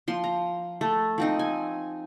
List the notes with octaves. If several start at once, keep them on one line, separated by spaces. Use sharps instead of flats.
F3 C6
A#5
A3
F3 C4 D#4
G#5